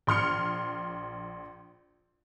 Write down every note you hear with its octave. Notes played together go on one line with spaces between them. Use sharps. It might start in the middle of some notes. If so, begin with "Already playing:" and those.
A#1 C6 F6 C#7